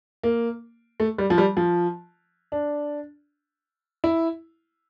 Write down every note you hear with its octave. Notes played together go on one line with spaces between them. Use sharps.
A#3
A3
G3
F3
G3
F3
D4
E4